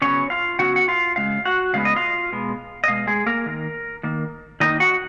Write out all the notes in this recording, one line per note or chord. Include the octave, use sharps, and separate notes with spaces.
C#3 F#3 B3 C#4 C#5
F4 F5
C#3 F#3 B3 F#4 F#5
F#5
F4 F5
C#3 G#3 F5
F#4 F#5
C#3 G#3 B3 F5
D#5
F4 F5
B2 G#3 B3
D#5
B2 G#3 F5
G#3 G#4
A#3 A#4
D#3 A#3
D#3 A#3
D#3 A#3 D#4 D#5
F#4 F#5